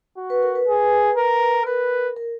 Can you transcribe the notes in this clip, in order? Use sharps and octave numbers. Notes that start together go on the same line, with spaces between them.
F#4
B4
A#4
B4
G#4
A#4
A#4 B4
A#4